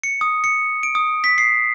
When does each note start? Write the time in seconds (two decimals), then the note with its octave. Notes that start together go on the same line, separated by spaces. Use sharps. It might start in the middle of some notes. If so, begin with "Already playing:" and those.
0.03 C#7
0.21 D#6
0.44 C#7
0.83 D7
0.95 D#6
1.24 B6
1.38 C7